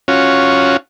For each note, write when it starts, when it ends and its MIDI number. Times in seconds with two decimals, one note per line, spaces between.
0.08 0.77 61
0.08 0.77 65
0.08 0.77 66
0.08 0.77 73